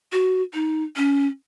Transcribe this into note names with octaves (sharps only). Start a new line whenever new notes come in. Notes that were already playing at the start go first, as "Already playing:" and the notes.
F#4
D#4
C#4